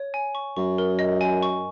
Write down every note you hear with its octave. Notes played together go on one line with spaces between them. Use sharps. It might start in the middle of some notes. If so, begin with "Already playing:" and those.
Already playing: C#5
G#5
C#6
F#2 C#6
A#4
D#5
G#5
C#6